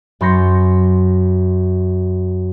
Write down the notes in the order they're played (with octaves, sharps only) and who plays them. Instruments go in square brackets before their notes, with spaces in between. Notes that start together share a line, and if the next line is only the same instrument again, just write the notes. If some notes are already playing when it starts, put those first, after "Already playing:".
[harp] F#2 B5 C6 G6 A#6 C#7